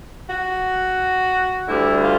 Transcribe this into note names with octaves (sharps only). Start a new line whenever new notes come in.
F#4
D2 D3 G3 E4
F4